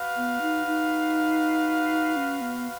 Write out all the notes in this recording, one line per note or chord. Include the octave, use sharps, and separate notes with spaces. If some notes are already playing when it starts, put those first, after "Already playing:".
Already playing: F#4 B4 F5
B3
D#4
D#4
C#4
B3